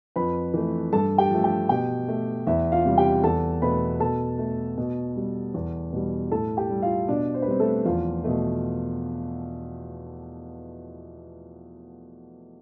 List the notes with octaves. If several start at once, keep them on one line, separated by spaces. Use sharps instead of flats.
F2 B4 B5
E3 A3
G2 A4 A5
G4 G5
F3 A3
G4 G5
B2 G4 G5
A3
E2 E4 E5
F4 F5
C3 G3
G4 G5
E2 A4 A5
B2 A3 B4 B5
B2 A4 A5
A3
B2
G3
E2
B2 G3
A2 A4 A5
G4 G5
G3
F4 F5
B2 D4 D5
C5
B4
G3 C4 C5
A3 A4
E2 F3 F4
B2 A3